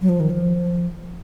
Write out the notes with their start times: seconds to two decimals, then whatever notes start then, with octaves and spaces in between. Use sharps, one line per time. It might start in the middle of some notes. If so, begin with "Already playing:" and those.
0.02 F#3
0.09 F3
0.20 D#3
0.30 F3